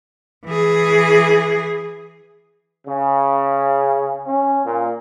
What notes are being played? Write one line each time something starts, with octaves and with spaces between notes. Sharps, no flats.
E3 G#4
C#3
C#4
A#2